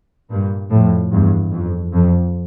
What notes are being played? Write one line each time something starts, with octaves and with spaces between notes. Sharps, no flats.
G2 A#2
F2 A2
E2 G2
F2
F2